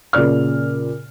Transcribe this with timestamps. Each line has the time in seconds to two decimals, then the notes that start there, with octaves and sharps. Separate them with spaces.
0.13 A#2 C#3 D5 F6